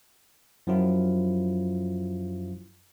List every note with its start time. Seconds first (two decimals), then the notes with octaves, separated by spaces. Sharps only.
0.67 F#2 F3 F#3 E4 F4